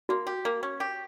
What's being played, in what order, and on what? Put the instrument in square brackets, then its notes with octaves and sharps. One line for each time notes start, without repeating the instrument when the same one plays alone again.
[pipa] A#3 [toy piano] F#4
[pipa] G4
A#3
C#4
G4